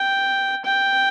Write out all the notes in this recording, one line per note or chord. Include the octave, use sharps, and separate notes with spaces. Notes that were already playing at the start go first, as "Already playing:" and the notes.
Already playing: G5
G5